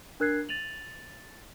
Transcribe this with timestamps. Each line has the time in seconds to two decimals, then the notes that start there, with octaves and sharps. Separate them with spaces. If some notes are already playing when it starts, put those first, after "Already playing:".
0.20 D4 A#4 F#6 G#6 C7
0.49 A6 D#7 F7 F#7